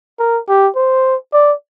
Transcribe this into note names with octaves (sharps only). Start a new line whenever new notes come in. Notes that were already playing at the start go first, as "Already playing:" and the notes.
A#4
G4
C5
D5